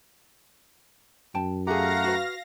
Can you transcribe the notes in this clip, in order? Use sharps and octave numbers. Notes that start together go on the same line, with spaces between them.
F#2 G5 A5
A3 G4 G#4 F5 F#5 A#5 A#6
F#4 B4